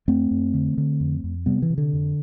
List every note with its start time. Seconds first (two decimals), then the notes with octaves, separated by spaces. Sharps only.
0.08 F2 A3 C4
0.31 F2
0.54 D3
0.78 D3
1.00 F2
1.24 F2
1.46 C3 G3 B3
1.62 E3
1.70 C3
1.78 D3
1.93 F2